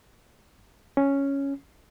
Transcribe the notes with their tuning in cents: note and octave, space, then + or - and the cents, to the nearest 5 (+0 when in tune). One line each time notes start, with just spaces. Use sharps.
C#4 +0